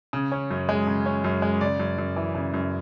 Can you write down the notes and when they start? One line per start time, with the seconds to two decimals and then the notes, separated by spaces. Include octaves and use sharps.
0.13 C#3
0.32 C#4
0.50 F#2
0.69 G#3
0.88 C#3
1.06 C#4
1.24 F#2
1.42 G#3
1.61 C#3 D5
1.80 F#2
1.98 F#2
2.16 E3
2.35 C#3
2.54 F#2